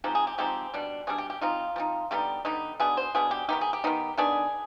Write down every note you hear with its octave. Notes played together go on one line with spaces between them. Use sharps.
F3 G#3 C4 D#4 G4
G#4
G4
F3 G#3 C4 D#4 G4
B2 G3 D4
B2 G3 D4 G#4
G4
G4
F3 C4 D#4 F4
F3 C4 D#4
D3 G3 B3 D#4 G4
D3 G3 B3 D#4
B2 B3 D4 G#4
C5
B2 B3 D4 G#4
G4
D#3 B3 D#4 G4
G#4
G4
D#3 B3 D#4
D#3 B3 D4 G#4